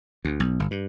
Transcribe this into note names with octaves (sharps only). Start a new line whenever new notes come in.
D2
B1
G1
G2